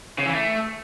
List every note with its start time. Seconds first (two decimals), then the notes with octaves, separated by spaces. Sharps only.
0.18 C#3
0.26 E3
0.34 A3